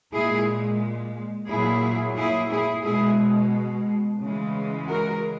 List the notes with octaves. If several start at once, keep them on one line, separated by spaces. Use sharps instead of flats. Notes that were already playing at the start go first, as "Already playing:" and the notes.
A#2 G#3 E4 G#4
A#2 F#3 E4 G#4
E4 G#4
E4 G#4
B2 G#3 E4 G#4
C#3 E3 G#3
F#4 A#4